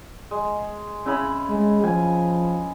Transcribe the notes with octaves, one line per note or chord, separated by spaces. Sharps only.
G#3
C#3 E4 B5
G#3
F3 G#5